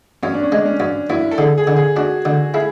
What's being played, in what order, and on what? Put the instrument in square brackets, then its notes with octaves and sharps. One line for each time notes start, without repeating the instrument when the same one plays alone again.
[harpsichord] F#2 [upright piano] C#4
[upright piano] D4
C#4
[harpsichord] G#3 [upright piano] D4
[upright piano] C#4
[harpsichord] F#2
[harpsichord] F#2 [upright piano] E4
[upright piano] A4
[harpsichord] D3 [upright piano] G#4
[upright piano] G#4
[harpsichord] D3
[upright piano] G#4
[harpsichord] D4 [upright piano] F#4
[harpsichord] D3
[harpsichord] E4 [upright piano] G#4